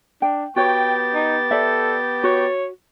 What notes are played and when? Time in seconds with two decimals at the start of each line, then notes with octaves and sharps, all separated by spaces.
0.22 D4 G5
0.56 B3 F#4 G4 C#5 G5 G6 A6
1.14 D#4
1.51 A4 D5 E5
2.24 F#4 C#5